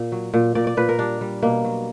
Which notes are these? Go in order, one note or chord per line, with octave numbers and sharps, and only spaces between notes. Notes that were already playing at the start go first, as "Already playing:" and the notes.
Already playing: A#2
F#3
A#2
A#2 D5
D5
A#2 B4
A#4
G3 D4
G3
B2 A#3
F#3